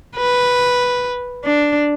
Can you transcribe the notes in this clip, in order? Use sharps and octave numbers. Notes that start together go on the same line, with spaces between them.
B4
D4